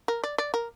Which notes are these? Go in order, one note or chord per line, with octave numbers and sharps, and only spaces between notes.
A#4
D5
D5
A#4